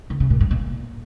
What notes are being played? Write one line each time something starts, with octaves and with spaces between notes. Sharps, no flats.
D3
C#3
A#2
G2
A#2